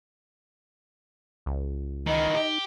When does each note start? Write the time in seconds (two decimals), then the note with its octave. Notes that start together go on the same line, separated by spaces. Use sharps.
1.46 C#2
2.07 D#3 E3 D#5
2.35 D#4 G4